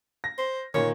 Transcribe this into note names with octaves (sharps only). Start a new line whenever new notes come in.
A#6
C5
A#2 D#3 C#5